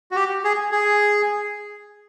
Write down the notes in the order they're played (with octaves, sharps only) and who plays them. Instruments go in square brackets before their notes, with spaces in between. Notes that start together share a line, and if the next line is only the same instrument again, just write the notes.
[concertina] F#4
G4
G#4
G#4